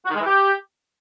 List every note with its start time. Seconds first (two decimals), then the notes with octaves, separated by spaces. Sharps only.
0.05 F#4
0.10 D#3
0.15 G#3
0.20 E3
0.26 G4